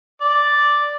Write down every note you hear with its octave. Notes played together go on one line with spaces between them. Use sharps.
D5